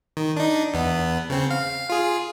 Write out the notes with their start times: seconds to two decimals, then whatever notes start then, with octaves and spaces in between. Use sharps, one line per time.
0.17 D#3
0.37 D4 D#4
0.74 E2 B3
1.30 C#3 C4
1.50 F5
1.90 F4 G#4